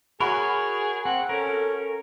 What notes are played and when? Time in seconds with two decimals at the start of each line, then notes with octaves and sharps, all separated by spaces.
0.20 F#4 G#4 A#4 C#5 B5 C#6
1.05 C4 F#5
1.29 C#4 A4 A#4